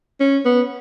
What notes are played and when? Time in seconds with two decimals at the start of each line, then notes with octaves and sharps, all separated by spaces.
0.20 C#4
0.45 B3